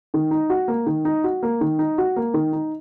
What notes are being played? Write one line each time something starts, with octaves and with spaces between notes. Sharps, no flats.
D#3
D#4
F#4
A#3
D#3
D#4
F#4
A#3
D#3
D#4
F#4
A#3
D#3
D#4